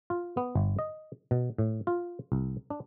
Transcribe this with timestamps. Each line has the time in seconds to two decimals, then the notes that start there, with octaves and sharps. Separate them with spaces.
0.10 F4
0.37 B3
0.56 G1
0.79 D#5
1.31 B2
1.58 A2
1.87 F4
2.32 C2
2.70 D4